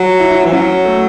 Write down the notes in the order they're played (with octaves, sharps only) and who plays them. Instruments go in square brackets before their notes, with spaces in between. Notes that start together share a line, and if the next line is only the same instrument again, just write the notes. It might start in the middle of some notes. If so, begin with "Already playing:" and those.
Already playing: [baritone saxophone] F#3 [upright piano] F#4
[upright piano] E4
E4
[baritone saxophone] E3
[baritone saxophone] F#3 [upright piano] C#4
[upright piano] A3